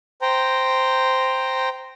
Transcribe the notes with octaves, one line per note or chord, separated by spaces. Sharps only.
C5 G5 A#5